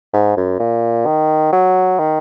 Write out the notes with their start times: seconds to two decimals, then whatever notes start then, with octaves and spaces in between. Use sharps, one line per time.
0.14 G#2
0.37 F#2
0.60 A#2
1.06 D#3
1.52 F#3
1.99 D#3